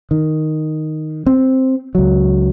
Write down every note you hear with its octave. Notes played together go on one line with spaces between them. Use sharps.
D#3
C4
C#2 F#3